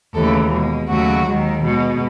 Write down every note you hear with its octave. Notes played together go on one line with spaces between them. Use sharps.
D#2 C#3 E3 A3 A4
B2 G#3
D#2 C#3 F#3 A3 F#4
D#2 D#3 G#3
B2 G#3